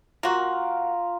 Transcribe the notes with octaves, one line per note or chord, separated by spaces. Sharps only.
A#3 F4 F#4 A#4